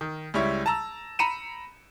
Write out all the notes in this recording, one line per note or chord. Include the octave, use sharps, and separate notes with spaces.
D#3
C#2 G3 E4 C#5
A5 A#5 E6
A#5 B5 C#7 D#7 E7